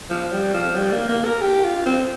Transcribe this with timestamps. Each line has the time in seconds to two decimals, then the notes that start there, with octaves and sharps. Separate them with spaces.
0.10 F3
0.32 G3
0.54 F3
0.76 G3
0.92 A#3
1.09 A#3
1.25 A#4
1.41 G4
1.64 F4
1.86 C4